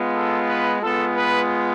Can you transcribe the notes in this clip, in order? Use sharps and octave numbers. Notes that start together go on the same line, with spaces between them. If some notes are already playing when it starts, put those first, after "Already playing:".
Already playing: G#3 B3 F4
A4
B4
G#3 B3 F4 A4
B4